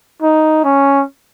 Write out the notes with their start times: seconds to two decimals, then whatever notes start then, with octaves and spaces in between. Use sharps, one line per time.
0.22 D#4
0.64 C#4